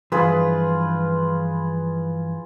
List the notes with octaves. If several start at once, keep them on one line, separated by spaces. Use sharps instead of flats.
G2 E3 F3 F4 G#4 B4